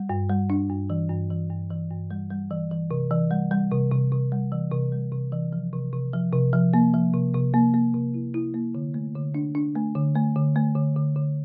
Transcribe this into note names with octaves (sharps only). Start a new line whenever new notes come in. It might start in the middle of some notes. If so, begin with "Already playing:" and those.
Already playing: G3
G2
G3
D4
G2
E3
G2
E3
G2
E3
G2
G3
G3
E3
E3
C3
E3
G3
G3
C3
C3
C3
G3
E3
C3
G3
C3
E3
F3
C3
C3
F3
C3
F3
A#3
F3
C3
C3
A#3
A#3
C3
E4
E4
A#3
D3
A3
D3
D4
D4
A3
D3
A3
D3
A3
D3
D3
D3